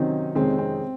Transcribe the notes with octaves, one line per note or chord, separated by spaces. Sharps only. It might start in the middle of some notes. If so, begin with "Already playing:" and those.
Already playing: C3 D#3 F#3 C4 C#4 D#4
F2 C3 D#3 G#3 C4 C#4
C4